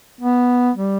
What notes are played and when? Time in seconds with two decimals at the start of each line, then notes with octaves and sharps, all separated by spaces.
0.21 B3
0.75 G3